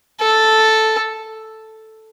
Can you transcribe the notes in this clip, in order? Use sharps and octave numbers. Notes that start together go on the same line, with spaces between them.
A4